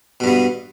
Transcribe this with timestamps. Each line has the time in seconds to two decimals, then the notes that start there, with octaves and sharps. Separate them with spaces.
0.20 B2
0.24 G2
0.27 B3